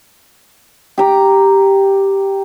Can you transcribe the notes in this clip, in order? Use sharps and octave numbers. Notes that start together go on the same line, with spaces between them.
G4 A#5